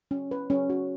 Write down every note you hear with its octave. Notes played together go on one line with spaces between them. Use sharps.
C#4
B4
C#4
F#4